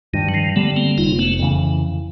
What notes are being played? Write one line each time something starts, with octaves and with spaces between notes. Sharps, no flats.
G2 D#3
F#3
D#3 F3
D3 G3 A3 B3
A#3 C4
F1 D#4 F4
A3 B3
F2 C#3 E3